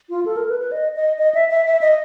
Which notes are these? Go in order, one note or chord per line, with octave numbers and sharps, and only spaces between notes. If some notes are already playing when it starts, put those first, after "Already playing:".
F4
A4
A#4
B4
B4
D#5
D#5
D#5
E5
E5
E5
D#5